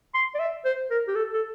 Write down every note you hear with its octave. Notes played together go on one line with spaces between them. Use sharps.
C6
D5
E5
C5
A#4
G4
A4
A4